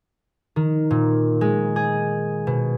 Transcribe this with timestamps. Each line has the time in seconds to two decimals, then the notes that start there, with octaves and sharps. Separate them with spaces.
0.56 D#3
0.91 A#2
1.41 G#3
1.76 G#4
2.47 B2